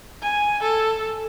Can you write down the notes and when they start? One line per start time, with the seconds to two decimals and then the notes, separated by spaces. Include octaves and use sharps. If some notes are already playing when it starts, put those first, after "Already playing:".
0.22 G#5
0.62 A4